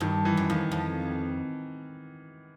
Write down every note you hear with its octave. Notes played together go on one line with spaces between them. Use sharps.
G2 D#3
E3
F#2
F2 D#3
F2